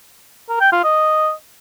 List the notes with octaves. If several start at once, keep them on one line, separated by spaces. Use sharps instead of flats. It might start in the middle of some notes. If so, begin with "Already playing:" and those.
A#4
G5
F4
D#5